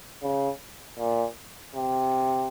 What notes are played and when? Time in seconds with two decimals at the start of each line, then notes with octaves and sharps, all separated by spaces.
0.23 C#3
0.99 A#2
1.75 C3